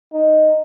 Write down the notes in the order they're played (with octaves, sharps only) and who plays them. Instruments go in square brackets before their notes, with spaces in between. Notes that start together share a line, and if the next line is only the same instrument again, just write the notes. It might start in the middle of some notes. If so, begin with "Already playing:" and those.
[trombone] D#4